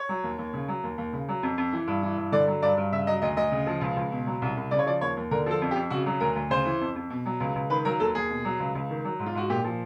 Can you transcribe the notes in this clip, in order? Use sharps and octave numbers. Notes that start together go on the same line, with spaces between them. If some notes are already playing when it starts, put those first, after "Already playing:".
Already playing: C#5
F#3
D#2
D#2
C#3
F#3
D#2
D#2
C#3
F#3
F2
F2
E3
G2
E3
G2
D3 D5
F#3
G2 D5
G2
C#3 E5
F#3 D#5
D2 D#5
D2 D#5
C#3
F3
C#2
C#2
B2
F#3
C2
C2
C#3 D5
C#5
F3 D5
D#2 C#5
D#2
D3 A#4
F3 A4
F2
G4
F2
C#3 F#4
F#3
D2 A#4
D2
C#3 C5
E3
F2
F2
B2
F#3
C#2
C#2
D#3 B4
F#3 A#4
D#2 A4
D#2 G#4
B2
F#3
C#2
C#2
D#3
F#3
G#2
F4
G#2 F#4
A#2 G4
F3